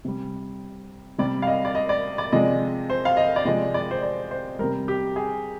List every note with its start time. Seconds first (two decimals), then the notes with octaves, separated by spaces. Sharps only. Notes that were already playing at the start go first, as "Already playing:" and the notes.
0.05 C3 G3
1.18 C3 G3 D5
1.42 F5
1.47 D#5
1.65 D5
1.75 D#5
1.89 D5
2.18 D5
2.32 C3 F3 G#3 D#5
2.90 C5
3.05 F5
3.17 D#5
3.36 D5
3.45 C3 F3 G#3 D#5
3.74 D5
3.91 C5
4.02 D5
4.31 C5
4.59 C3 G3 A#4
4.88 G4
5.16 G#4